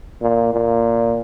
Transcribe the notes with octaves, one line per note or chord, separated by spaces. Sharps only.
A#2
A#2